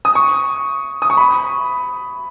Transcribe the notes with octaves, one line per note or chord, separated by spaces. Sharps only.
D#6
C#6
D#6
C#6
B5